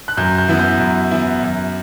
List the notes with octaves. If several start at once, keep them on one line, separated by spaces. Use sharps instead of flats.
F#6
F#2 G6
G6
E3 B3 E4
G6
F#2
E3 B3 E4
F#2